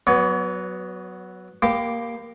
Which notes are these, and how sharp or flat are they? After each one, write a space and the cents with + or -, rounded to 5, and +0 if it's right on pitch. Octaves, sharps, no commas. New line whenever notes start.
F#3 +0 B3 +0 C#5 +40
A#3 +5 G4 +0 B5 +35